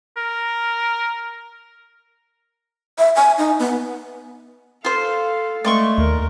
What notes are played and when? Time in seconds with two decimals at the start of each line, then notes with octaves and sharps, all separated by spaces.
0.17 A#4
2.99 E5
3.16 G#5
3.38 D#4
3.59 B3
4.85 F4 A4 C5 F5
5.65 G#3 A3 D5 C6 C#6
5.98 D#2 A#4